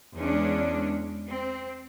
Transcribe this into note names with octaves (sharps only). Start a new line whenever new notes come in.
E2 G#3 C#4 D4
C4